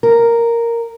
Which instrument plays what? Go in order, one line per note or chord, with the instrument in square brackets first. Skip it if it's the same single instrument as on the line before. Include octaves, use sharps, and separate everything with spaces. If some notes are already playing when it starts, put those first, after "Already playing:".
[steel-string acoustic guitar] A#4